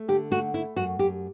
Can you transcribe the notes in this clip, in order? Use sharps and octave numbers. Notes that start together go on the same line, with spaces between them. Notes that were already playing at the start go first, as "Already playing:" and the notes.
Already playing: A3
D3 G4
A3 F#4
A3 E4
F#2 F#4
F#2 G4